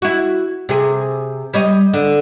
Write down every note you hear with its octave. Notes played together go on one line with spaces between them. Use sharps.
E4 F#4
C3 G#4
G3 C#5 D#5
D3